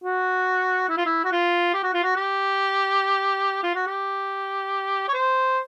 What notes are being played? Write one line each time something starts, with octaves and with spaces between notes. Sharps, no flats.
F#4
E4
F4
E4
F#4
F4
G4
F#4
F4
F#4
G4
F4
F#4
G4
C#5
C5